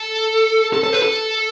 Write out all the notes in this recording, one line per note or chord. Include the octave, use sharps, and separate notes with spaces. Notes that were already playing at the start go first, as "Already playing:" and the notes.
Already playing: A4
A4
A4
B4
A4